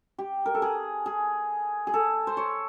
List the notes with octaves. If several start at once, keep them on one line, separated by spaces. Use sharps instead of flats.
G4
A#4
A4
G#4
G#4
G#4
A4
C5
C#5